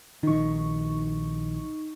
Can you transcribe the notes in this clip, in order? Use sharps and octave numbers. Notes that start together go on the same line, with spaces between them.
A#1 D#3 D#4 C#6